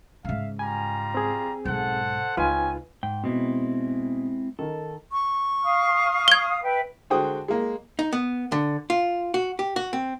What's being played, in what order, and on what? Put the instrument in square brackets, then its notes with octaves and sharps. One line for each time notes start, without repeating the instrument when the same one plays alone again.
[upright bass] G#2 C#3 [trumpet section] E5 F5
[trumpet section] G3 F4 A#5 [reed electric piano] G#5
[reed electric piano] C4 G#4
[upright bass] B1 G#2 [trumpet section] A4 C5 F#5
[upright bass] C#2 [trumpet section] C4 C#4 G#5 [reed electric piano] D#4 F4 B4
[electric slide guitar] G#2 G5
[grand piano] B2 [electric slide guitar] G#3 C4 E4
[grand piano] D#3 [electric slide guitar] A4
[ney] C#6
[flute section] F5 D#6 F6
[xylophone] G#6 G7
[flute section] B4 E5 G5
[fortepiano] D3 G#3 F#4 C5 G5 D#6
G#3 A#3
[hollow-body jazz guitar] D#4
B3
D3
F4
F#4
G4
F#4
C4